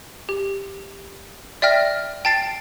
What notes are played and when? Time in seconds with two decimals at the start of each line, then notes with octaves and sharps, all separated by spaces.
0.29 G4
1.62 D5 E5 G5 F6 A#6
2.25 G5 A5 A6 C7 D7